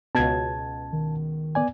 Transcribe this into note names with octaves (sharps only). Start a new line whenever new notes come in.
C#2 B2 A5 G#6
D#3
B3 D5 G#5